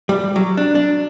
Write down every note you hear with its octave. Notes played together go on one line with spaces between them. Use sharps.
G3
F#3
D4
D4